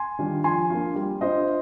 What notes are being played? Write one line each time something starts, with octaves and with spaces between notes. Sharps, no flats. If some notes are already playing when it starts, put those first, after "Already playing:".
Already playing: G#5 C6
D#3 G3 D4 F4
F3 G#5 C6
A#3 D4 F4
G3
D4 F4 C5 D#5